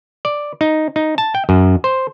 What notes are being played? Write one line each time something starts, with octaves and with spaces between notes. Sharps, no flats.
D5
D#4
D#4
A5
G5
F#2
C5